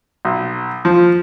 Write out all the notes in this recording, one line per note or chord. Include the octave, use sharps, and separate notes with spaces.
B1
F3